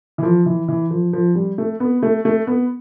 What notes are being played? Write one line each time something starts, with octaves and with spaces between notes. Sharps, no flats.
E3
F3
E3
E3
F3
F3
G3
A3
B3
A3
A3
B3